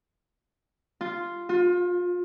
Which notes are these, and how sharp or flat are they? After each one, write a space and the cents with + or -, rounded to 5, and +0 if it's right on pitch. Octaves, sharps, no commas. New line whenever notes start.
F4 -5
F4 +30